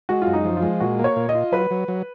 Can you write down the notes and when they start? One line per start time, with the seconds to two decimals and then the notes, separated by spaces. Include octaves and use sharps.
0.09 G#3 F#4
0.22 F4
0.27 F#2
0.33 D#4
0.45 F3
0.57 F4
0.62 G#3
0.80 A#2 F#4
0.99 A#3
1.04 C#5
1.16 A#2
1.29 D#5
1.35 F4
1.52 F#3 B4
1.71 F#3
1.88 F#3